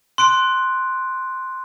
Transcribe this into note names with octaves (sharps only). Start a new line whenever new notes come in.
C6 F#6 D7